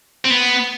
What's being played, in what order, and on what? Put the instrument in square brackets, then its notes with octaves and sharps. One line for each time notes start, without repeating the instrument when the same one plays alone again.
[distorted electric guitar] C4
B3